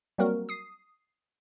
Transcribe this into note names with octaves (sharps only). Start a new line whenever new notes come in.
F#3 G3 A#3 C4 F#4 A#4
D#6 C7